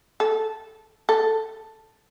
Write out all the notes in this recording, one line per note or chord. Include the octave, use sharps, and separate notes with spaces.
A4
A4